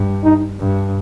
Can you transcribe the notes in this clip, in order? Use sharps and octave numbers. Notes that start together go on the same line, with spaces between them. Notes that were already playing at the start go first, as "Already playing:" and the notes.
Already playing: G2
D#4
G2